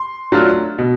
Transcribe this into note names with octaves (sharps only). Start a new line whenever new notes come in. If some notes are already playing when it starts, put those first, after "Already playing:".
Already playing: C6
F#3 A3 D4 F4
B2